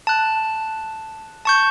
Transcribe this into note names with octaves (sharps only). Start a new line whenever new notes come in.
A5 F#6
A5 C#6 G6